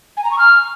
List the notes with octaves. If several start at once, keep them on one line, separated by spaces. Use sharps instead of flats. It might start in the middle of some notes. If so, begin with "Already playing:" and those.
G#5
A#5
C#6
F6